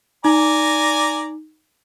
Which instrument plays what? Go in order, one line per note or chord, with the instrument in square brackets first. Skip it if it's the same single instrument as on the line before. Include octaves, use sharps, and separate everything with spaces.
[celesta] D#4 [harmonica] D5 G#5 A#5